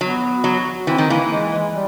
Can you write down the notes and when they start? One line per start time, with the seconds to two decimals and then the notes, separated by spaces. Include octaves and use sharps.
0.01 F#3 B3
0.44 F#3
0.87 E3 C4
0.98 D#3
1.08 E3 A#3
1.30 G#3
1.51 G#3
1.73 G3